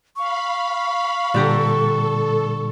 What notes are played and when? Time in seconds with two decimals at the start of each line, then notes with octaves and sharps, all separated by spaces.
0.16 F5 B5 C#6
1.34 A#2 D3 G3 G4 A4 A#5